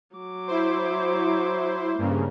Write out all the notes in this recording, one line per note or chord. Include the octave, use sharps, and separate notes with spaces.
F#3 D6
E4 C5
G2 C#3 A#3